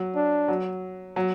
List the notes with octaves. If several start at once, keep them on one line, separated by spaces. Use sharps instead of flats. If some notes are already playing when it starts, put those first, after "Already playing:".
Already playing: F#3
D4
F#3
F#3